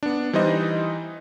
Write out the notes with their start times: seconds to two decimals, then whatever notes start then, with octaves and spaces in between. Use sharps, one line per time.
0.03 B3 D4
0.33 E3 G3 D#4 C5 D#5